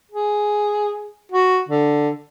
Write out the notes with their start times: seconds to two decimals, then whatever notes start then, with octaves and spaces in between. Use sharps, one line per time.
0.12 G#4
1.32 F#4
1.69 D3